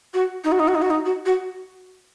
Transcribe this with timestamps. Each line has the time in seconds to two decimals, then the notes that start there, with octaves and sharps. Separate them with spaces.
0.14 F#4
0.44 D#4
0.52 F#4
0.59 D#4
0.68 F#4
0.75 D#4
0.82 F#4
0.90 D#4
1.06 F#4
1.26 F#4